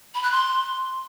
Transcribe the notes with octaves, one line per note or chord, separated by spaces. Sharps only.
B5
F#6
C6